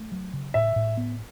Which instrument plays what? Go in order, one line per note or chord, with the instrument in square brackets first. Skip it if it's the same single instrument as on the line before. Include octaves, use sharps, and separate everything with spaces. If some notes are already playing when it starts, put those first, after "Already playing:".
Already playing: [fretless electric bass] A3
F#3
C#3
[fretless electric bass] A2 [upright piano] E5
[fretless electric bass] A2
B3